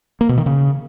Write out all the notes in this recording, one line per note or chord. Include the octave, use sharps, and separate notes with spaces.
A#3
B2
D#3
C#3